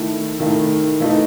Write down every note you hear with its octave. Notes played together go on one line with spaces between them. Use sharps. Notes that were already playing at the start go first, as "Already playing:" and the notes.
Already playing: D#3 A3 E4
D#3 A3 E4
E3 A3 D#4